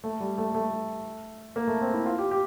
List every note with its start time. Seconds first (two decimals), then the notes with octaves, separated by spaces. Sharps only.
0.04 A3
0.20 G3
0.38 A3
0.55 A3
1.56 A#3
1.68 A3
1.81 C4
1.94 E4
2.06 F4
2.18 G4
2.31 G4